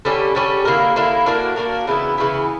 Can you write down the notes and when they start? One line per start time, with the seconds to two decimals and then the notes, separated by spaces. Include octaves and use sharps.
0.05 D3 G3 C#4 G4
0.35 D3 G3 C#4 G4
0.65 D3 A#3 E4 A#4
0.96 D3 A#3 E4 A#4
1.26 A#3 D4 F#4 A#4
1.56 A#3 D4 F#4 A#4
1.87 C#3 E3 B3 E4
2.18 C#3 E3 B3 E4